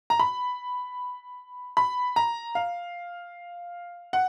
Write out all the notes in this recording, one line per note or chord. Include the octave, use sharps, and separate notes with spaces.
A#5
B5
B5
A#5
F5
F#5